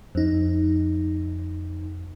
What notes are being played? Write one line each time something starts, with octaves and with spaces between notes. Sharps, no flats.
F2 D#4